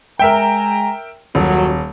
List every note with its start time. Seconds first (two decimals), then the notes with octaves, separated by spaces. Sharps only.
0.19 G#3 A#4 E5 G5 G#5 A#5
1.35 D#1 F#2 F#3